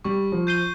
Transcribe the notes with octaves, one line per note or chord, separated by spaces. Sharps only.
G3 C#6
F3
G6 C7 D#7 G7